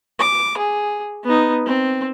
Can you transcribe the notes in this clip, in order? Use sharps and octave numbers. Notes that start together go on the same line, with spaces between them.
D6
G#4
B3 D#4
C4